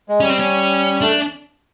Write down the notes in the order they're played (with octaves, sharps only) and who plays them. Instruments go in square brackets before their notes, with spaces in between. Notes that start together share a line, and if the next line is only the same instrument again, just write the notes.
[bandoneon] G#3
[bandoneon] G3 [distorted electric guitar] C#4
[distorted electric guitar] C4
C#4
[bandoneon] A3 [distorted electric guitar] D4